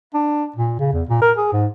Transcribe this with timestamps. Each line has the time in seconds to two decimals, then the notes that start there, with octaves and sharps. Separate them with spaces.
0.14 D4
0.56 A#2
0.79 C#3
0.93 E2
1.09 A#2
1.22 A#4
1.37 G#4
1.53 G#2